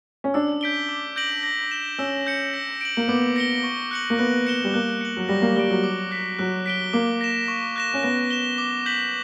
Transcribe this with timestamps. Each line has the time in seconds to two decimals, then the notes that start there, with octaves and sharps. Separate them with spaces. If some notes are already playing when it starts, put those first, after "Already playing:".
0.24 C#4
0.34 D4 E6
0.61 G6 B6 D7 G7
0.89 D6
1.16 G6 A#6 D7 F#7
1.43 A#6
1.71 E7 G7
1.98 C#4 E6
2.27 G6 C#7
2.54 A#6
2.81 D7 F#7
2.97 A#3
3.08 B3 D6
3.36 A#6 C#7 G7
3.64 C#6
3.91 F#6 C#7 F#7
4.10 A#3
4.19 B3 F#6
4.47 C#7 E7 G7
4.64 G3
4.74 A#3 F#6
5.01 C#7 F#7
5.17 F#3
5.29 G3 A#6
5.42 A#3
5.56 G3 G7
5.59 D7
5.70 F#3
5.84 D6
6.11 F#6 B6
6.39 F#3 F#6
6.66 B6 D7 G7
6.93 A#3 D6
7.21 A#6 E7
7.48 C#6
7.76 F#6 A#6 E7
7.94 C#4
8.03 B3 A#6
8.31 E7 G7
8.58 D6
8.86 G6 B6 F#7